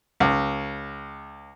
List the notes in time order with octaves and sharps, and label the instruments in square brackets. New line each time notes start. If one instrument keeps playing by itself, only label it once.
[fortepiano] C#2